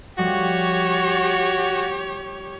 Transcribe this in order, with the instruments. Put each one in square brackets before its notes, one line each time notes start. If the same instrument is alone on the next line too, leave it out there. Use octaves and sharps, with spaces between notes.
[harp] F3 G3 A3 [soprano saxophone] F#4 [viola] G4 C#5